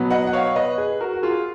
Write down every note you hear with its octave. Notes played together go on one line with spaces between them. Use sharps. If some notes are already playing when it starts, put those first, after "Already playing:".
Already playing: B2 F#3 B3
D#5 F#5
F#5
C#5 F5
B4 D#5
G#4 B4
F#4 A#4
F#4
F4 G#4